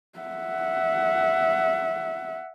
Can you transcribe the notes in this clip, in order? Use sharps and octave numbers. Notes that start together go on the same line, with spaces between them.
E5 F#5